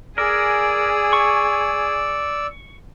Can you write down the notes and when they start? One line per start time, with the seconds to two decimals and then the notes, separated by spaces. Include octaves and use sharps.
0.18 G#4 A#4 D5 G#5 E6
1.13 C#6